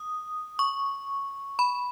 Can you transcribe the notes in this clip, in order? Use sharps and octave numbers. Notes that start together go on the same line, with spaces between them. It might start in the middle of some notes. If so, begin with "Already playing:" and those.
Already playing: D#6
C#6
B5